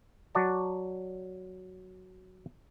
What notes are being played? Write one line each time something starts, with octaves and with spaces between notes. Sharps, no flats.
F#3 F#4 D5 A5